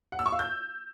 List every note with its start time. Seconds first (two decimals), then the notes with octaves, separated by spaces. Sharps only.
0.12 F#5
0.19 E6
0.26 C#6
0.32 F5
0.39 G6